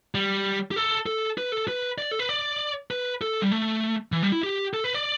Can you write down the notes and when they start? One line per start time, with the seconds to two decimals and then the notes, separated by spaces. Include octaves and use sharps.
0.15 G3
0.71 G4
0.76 A4
1.06 A4
1.38 B4
1.52 A4
1.68 B4
1.98 D5
2.11 A4
2.19 B4
2.29 D5
2.91 B4
3.21 A4
3.42 G3
3.52 A3
4.12 E3
4.23 G3
4.32 E4
4.44 G4
4.74 A4
4.84 B4
4.94 D5